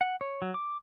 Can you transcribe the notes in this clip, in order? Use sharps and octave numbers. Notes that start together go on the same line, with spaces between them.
F#5
C#5
F#3
D6